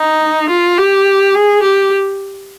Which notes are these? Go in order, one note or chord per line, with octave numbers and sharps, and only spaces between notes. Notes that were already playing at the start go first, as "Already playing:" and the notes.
Already playing: D#4
F4
G4
G#4
G4